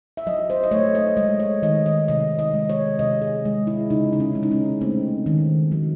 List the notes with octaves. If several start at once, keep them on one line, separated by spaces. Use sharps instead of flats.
E5
F#3 D#5
C5
D#5
A3 C#5
D#5
G#3 D#5
C#5
D#3 D#5
D#5
C3 D#5
D#5
G#3
C#5
C3 D#5
G#4
G#3
E4
C#3 D#4
D#4
C#4
G#3
D#4
C#4
A3 C4
D#3
F#3